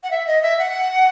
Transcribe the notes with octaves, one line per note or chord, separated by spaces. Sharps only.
F#5
E5
D#5
E5
F#5